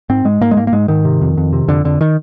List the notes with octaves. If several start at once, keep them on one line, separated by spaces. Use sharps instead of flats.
G#2 C4
G#2 G#3
G#2 A#3
G#3
G#2 A#3
A#3
G#2 G#3
G#2 D#3
C3
F2
F2
C3
F2 D3
F2 D3
D#3